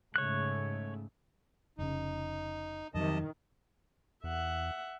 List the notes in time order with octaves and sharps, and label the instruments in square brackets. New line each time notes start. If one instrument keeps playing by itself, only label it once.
[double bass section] G#2 C#3 A3 [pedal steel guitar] C#5 F#6
[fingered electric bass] F1 C#3 [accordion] D#4
[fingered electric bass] F2 F#3 [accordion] C3 D#5 A5 [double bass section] D#3
[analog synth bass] E2 [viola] E5 F#5